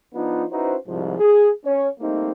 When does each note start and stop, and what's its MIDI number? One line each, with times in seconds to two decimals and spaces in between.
0.14 0.45 53
0.14 0.45 59
0.14 0.45 62
0.14 0.45 63
0.14 0.45 65
0.51 0.76 61
0.51 0.76 63
0.51 0.76 64
0.51 0.76 66
0.51 0.76 71
0.51 0.76 72
0.86 1.18 36
0.86 1.18 44
0.86 1.18 53
1.18 1.49 68
1.64 1.88 61
1.64 1.88 73
2.00 2.32 55
2.00 2.32 57
2.00 2.32 58
2.00 2.32 60
2.00 2.32 63